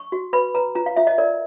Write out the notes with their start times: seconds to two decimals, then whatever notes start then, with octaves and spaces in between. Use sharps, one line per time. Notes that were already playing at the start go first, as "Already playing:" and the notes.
Already playing: C#6
0.12 F#4
0.33 B4 B5
0.55 B4 A#5
0.75 F4 A#5
0.86 F5
0.96 F4 E5
1.07 D#5
1.18 A#4 D5